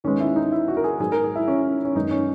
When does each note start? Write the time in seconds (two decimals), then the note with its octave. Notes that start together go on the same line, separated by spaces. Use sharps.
0.04 D#2 D#3 G#3 B3 C#4
0.20 E4
0.36 D#4
0.52 E4
0.68 F#4
0.77 A#4
0.84 G#4
1.00 G#2 F#3 B3 G#4
1.12 A#4
1.24 G#4
1.36 E4
1.48 C#4
1.85 C#4
1.95 F#2 D#3 G#3 B3 D#4
2.11 C#4